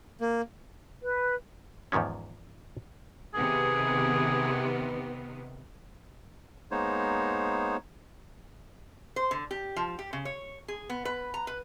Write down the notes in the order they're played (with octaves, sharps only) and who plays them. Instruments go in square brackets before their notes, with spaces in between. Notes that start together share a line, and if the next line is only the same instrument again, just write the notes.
[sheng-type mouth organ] A#3
[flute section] B4
[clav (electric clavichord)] E2 G#2 D#3 F3 C#4
[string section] C3 D#3 B3 [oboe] G#4
[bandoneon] G#3 A#3 B3 D#4 C5 C#5
[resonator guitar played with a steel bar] C5
D3
G4
F3
G4
C#3
C#5
G#4
B3
B4
A#5
B4